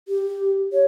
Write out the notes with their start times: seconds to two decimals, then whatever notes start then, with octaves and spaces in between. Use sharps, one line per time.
0.08 G4
0.73 C#5